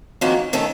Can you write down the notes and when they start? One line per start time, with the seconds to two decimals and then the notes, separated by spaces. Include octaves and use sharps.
0.21 F2 D#3 A#3 C#4 F#4
0.53 D#3 A3 C#4 A4